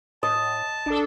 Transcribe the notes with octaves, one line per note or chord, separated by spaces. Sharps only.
A2 D#5 A5
A1 D4 A4